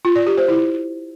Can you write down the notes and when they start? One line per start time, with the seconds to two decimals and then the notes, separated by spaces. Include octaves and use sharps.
0.05 F4
0.16 D5
0.27 G4
0.38 C5
0.48 E4